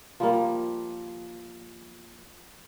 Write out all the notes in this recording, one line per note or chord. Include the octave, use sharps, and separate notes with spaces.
F3 G3 A#3